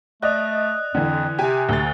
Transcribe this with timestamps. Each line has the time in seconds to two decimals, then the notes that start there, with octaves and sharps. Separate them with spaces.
0.22 A3 D5 D#5 D#6 F#6
0.95 F2 D3 E3
1.39 C3 G4 G#5
1.69 D2 A6